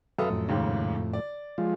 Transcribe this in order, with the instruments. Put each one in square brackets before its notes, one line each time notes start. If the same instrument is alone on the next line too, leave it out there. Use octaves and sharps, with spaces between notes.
[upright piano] F#2 A4 D#6 [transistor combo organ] B4 E5 F5
[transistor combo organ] F2 A2
[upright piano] D#2 G#2 C#3
D5
[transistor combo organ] F3 G#3 F4